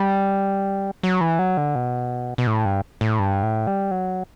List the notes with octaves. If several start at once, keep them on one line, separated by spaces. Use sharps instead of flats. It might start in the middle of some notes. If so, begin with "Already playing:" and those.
Already playing: G3
F#3
E3
F#3
D3
B2
B2
A2
G2
A2
G2
A2
G3
F#3